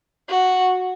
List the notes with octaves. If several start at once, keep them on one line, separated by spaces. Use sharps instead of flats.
F#4